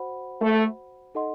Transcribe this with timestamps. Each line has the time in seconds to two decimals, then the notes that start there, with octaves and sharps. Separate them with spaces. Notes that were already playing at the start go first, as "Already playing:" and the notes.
Already playing: F#4 C5 F#5 B5
0.42 A3
1.15 D#4 A4 D#5 F#5 C6